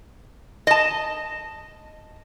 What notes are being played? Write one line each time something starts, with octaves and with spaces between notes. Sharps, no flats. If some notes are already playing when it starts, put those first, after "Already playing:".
D#5 A5